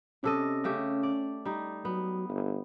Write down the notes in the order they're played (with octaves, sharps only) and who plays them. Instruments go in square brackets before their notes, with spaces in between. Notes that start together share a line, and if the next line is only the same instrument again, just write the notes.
[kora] C3 A4 D#5 [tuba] C#4
[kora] C#3 A3 G4
D5
G3 D#4
[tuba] F#3 [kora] B3
[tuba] G1